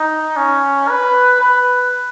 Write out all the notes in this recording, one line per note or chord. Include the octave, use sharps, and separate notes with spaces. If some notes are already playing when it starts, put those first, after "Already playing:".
Already playing: D#4
C#4
B4
B4